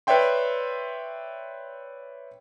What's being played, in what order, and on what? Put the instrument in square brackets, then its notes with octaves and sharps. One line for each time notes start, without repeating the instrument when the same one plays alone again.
[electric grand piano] B4 C#5 D5 E5 G5 C6